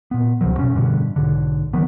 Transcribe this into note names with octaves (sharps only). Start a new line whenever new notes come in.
A#2 B3
C#2 C3 F3 F#3
F#2 B2 C#4
A1 G2 B2 D3
B1 G#2 D3
D#3 E3 F#3 B3